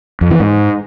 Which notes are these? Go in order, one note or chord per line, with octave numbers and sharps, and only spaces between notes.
F2
E3
G#2